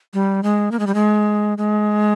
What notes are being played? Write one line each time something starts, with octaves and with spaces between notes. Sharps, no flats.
G3
G#3
A#3
G#3
G3
G#3
G#3